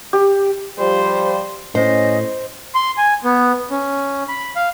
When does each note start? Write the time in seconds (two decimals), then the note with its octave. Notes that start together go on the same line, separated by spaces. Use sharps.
0.13 G4
0.79 F3 G3 C5
1.75 A2 C#4 C5 D#5
2.75 C6
2.97 G#5
3.24 B3
3.70 C#4
4.28 B5
4.56 F5